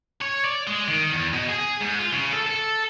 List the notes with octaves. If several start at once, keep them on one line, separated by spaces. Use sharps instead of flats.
C#5
D5
G#3
D#3
E2
B2
G#4
G#2
F4
C#3
A4
A4